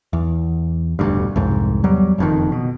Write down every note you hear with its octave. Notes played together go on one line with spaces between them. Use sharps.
E2
E1 D2 G2
C2 F2 G#2
E2 F#3 G3
F#1 F2 D#3
B2